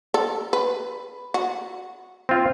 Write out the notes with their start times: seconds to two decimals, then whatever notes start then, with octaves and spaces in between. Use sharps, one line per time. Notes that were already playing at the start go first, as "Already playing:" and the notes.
0.14 A4
0.53 B4
1.34 F#4
2.29 C4 F4